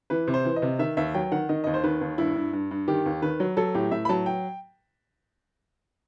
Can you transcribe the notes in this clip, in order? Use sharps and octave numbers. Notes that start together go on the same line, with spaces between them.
E3 B4
C3
C5
E3
D#5
C3
D#3 E5
D#2 E5
F#3 G5
D#3 F#5
D#3 D#5
D#2 D#5
C5
D#3 B4
D#2
G2 E4
G2
G2
G2
D#3 G4
D#2
D#3 B4
F#3
F#3 A4
A2 G4
A2 E5
B5
F#3 A5
G5